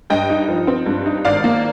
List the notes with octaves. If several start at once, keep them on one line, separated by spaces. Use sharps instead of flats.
G2 D#5 G5
D#4
F3
C4
G2
D#4
G#1 D5 F5
A#3